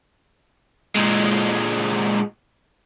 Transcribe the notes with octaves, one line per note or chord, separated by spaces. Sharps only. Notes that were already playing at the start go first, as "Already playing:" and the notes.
A#2 G#3